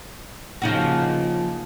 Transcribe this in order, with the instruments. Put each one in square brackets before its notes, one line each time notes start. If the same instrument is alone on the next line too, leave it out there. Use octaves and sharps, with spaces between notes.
[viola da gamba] C#3 A#3 [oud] F3 D#4 F#4